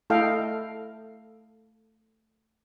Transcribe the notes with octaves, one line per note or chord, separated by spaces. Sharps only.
A3 E4 A4 D#5 F5 G5